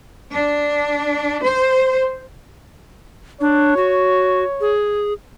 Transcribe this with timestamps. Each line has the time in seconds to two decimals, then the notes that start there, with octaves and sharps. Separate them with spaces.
0.34 D4
1.44 C5
3.41 D4 C#5
3.77 F#4
4.61 G#4